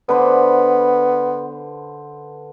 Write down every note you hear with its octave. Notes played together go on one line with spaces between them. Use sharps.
D3 B3 B4 C5